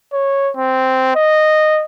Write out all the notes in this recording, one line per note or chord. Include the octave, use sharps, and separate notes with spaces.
C#5
C4
D#5